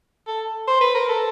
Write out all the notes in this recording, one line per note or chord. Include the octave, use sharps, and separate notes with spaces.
A4
C5
B4
A#4
A4